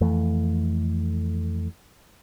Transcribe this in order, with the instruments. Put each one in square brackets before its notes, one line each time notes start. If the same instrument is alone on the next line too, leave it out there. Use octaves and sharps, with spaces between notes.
[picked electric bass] F2 E3 A3